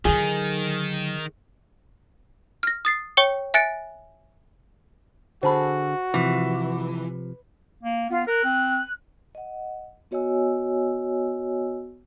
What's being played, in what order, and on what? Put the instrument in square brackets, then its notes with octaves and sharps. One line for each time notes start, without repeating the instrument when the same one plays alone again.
[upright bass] D3 F#3 [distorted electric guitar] D#3 [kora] G#4
[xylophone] F6 A#6
D#6 A6 C7
C#5 G5 C#6 C#7 G7
E5 G#5 F#6 A6 C#7 D7
[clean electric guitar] D3 G#4 A4 [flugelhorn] F#4 [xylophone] C5 A5 B5
[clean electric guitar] C3 F3 [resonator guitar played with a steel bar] E3
[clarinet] A#3
[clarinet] B3 [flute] F4
[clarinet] A#4 [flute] F#6
[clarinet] C4
[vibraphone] D#5 F#5
B3 F#4 C#5 D#5 G#5 E6